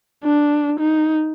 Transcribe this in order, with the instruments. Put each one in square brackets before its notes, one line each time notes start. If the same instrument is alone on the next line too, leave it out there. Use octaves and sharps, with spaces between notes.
[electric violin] D4
D#4